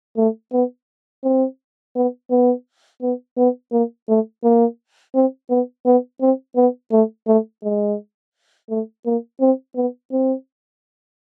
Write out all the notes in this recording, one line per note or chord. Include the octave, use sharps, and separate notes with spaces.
A3
B3
C4
B3
B3
B3
B3
A#3
A3
A#3
C4
B3
B3
C4
B3
A3
A3
G#3
A3
A#3
C4
B3
C4